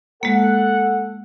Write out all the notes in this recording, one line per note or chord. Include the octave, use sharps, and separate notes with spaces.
G#3 A#3 A4 F#5